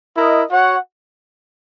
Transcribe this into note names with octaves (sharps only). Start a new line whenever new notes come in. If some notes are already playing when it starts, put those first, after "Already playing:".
E4 A#4 D#5
F#4 C#5 F#5